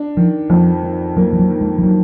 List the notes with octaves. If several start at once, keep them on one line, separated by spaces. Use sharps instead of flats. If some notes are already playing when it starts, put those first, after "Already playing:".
Already playing: D4
D#3 F3
F2 F3
D#3
F#3 A#3
F3
F#3
D#3
G#3
F3
D#3 F#3